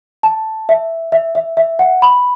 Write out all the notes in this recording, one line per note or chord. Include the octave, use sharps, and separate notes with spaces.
A5
E5
E5
E5
E5
F#5
B5